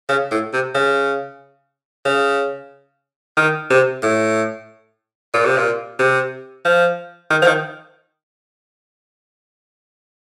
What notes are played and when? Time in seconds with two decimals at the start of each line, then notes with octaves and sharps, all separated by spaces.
0.09 C#3
0.31 A2
0.53 C3
0.75 C#3
2.05 C#3
3.37 D#3
3.70 C3
4.03 A2
5.34 A#2
5.45 C3
5.57 A#2
5.99 C3
6.65 F3
7.31 D#3
7.42 F3
7.47 D#3